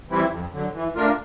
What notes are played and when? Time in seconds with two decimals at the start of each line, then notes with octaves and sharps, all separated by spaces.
0.09 E3 G3 C4 E4
0.30 F2
0.52 D3 F#3
0.74 E3
0.96 A3 D4 F4 A#4